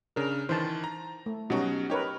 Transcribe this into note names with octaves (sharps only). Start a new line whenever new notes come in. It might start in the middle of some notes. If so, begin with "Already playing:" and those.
C#3 D4 A#4
D#3 E3 C5 A5
A#5
A3
B2 F#3 G3 C#4 D#4 F#4
D#4 G4 A#4 B4 C#5